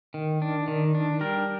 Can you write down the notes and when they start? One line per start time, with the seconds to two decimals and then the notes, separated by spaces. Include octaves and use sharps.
0.14 D#3
0.42 D4
0.68 D#3
0.95 D4
1.21 G3 A#4